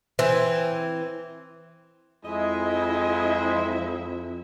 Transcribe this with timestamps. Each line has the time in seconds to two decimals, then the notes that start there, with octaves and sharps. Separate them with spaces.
0.19 E3 C4
2.25 F2 G#3 E4 D#5 E5